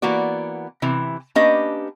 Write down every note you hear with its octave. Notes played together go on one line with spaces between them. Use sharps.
E3 A#3 B3 F#4 D5
C3 E3
A#3 C#4 D4 G4 B4 D#5